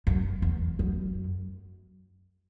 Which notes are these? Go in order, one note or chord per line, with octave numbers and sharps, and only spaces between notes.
F#2
E2
F#2